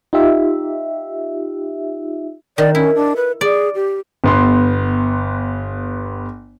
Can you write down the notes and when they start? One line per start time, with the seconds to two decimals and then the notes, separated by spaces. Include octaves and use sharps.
0.13 D#4 F4 G4 E5
2.58 D#3 D5
2.75 C#4 E4
2.95 D4
3.16 B4
3.41 G#4 D5
3.75 G4
4.24 G1 B3 C6